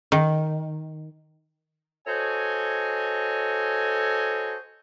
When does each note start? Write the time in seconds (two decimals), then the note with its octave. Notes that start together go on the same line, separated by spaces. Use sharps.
0.12 D#3
2.07 F#4 A4 C5 C#5 D#5 G#5